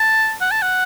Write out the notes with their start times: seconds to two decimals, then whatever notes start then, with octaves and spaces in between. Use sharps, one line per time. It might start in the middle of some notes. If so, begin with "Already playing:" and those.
Already playing: A5
0.41 F#5
0.51 A5
0.62 F#5